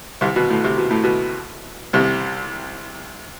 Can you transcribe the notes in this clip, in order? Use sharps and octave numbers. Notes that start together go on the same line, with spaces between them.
C2 C3
B2
A2
C3
B2
A2
B2
C2 C3